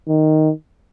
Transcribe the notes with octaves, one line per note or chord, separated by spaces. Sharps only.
D#3